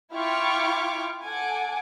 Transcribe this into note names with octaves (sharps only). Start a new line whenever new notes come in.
E4 F4 G5 C#6 D6 F6
A4 F#5 G#5 D6